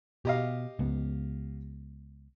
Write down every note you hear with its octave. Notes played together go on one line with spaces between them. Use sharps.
B2 G4 D#5 F5
C#2 B3